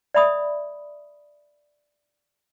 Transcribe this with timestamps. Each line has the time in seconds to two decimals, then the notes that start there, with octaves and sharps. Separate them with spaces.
0.14 D5 E5 B5 D#6